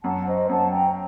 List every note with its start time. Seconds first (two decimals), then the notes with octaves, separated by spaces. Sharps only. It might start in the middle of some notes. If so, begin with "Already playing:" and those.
0.04 F#2 F#5 A5
0.27 C5 D#5
0.49 F#2 F#5 A5
0.71 G5 A#5